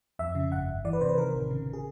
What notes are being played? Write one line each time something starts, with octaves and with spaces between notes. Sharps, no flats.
F2 E5
C#3
G1 F#5
G1
E3 D5
B4
C3 C5
B4
D#3 A#4
A1
C#3
C#3
G#4